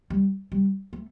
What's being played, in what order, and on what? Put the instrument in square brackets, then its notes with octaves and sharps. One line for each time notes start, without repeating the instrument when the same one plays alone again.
[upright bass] G3
G3
A3